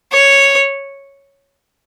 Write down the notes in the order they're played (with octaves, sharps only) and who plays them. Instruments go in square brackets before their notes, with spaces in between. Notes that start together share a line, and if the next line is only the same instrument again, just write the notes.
[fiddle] C#5